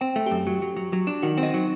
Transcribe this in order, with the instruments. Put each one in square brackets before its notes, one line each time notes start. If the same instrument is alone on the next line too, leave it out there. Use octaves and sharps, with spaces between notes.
[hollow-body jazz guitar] C4 [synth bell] G5
[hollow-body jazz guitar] A3
[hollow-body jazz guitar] F#2 [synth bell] G4 G5
[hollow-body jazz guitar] F#3
F#3
F#3
F#3
D4
[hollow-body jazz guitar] D#3 [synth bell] F#4 F#5
[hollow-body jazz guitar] C4
[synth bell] D#4 D#5
[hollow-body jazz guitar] F#3